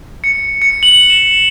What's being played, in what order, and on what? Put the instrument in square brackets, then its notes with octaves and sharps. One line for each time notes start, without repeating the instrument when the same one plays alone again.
[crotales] C#7
C#7
F#7
E7